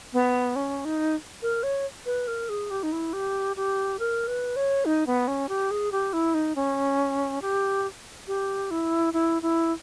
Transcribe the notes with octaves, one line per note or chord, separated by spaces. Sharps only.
B3
C#4
D#4
A#4
C#5
B4
A#4
G#4
G4
D#4
E4
G4
G4
A#4
B4
C#5
D#4
B3
C#4
G4
G#4
G4
E4
D#4
C#4
G4
G4
E4
E4
E4